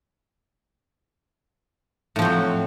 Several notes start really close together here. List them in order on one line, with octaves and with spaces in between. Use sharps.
A2 F3 C4 F#3